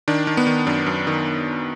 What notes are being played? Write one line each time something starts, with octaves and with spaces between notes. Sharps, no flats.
D#3 D4
D#3
B3
D#3
F#2 D4
F#2
D#3